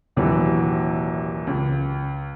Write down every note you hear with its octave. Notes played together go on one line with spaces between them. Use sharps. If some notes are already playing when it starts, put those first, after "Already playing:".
A#1 D#2 C3 E3 F#3
C#2